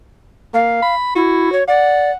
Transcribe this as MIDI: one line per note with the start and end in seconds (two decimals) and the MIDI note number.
0.54 0.79 58
0.54 0.95 77
0.83 1.11 83
1.15 1.52 64
1.15 1.60 66
1.52 1.63 73
1.68 2.11 74
1.68 2.16 78